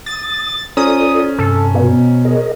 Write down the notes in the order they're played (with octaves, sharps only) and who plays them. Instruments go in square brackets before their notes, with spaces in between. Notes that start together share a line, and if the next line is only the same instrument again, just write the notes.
[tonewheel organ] D#6 [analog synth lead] A6
[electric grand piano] C#4 C5 A#5 [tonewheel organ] F4 A4 D5 [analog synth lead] D#6
[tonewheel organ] G2 C3 [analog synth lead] A4
[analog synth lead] B2
[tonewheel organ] G#4 A#4 D#5